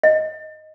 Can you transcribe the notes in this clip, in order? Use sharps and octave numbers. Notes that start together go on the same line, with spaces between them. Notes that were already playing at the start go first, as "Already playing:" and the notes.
D#5